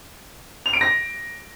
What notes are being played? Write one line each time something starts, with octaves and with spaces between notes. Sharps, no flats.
F7
D7
A#6